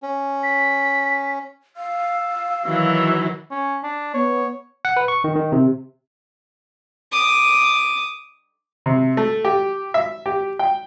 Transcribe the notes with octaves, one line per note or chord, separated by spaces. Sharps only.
C#4
B6
F5 E6
D#3 E3 F#3 E6
C#4
D4
B3 C#5
F#5
B4
C#6
D#3
D#3
C3
D6 D#6
C3
A3
G4
E5
G4
G5